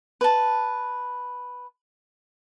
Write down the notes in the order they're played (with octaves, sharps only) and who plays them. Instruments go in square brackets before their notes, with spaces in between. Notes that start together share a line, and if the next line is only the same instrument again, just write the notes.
[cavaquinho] B4 A5